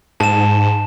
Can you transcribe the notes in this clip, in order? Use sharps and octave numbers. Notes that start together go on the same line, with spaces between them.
G#2 A5 E7